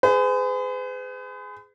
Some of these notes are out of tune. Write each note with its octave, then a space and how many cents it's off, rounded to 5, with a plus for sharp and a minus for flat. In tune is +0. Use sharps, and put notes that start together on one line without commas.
G#4 +0 B4 +45